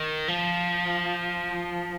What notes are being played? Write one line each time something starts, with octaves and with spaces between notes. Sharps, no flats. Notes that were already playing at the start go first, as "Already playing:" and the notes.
Already playing: D#3
F3